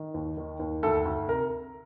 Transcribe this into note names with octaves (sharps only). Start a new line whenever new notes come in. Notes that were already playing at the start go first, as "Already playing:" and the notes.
Already playing: D#3
D#2
D#3
D#2
D2 A4
D2
C3 A#4